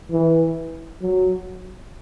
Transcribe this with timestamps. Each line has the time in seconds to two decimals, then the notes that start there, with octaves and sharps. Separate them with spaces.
0.12 E3
1.02 F#3